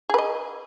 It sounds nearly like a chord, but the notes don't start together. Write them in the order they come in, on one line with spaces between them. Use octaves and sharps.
G#4 B4 D#5